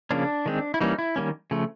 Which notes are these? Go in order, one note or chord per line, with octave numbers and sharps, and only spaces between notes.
C#3 F3 A#3 C#4 D4
D#3 G#3 C4
E4
E3 G3 A#3 C#4 D#4
E4
D#3 G3 A#3 C#4
C#3 F3 A3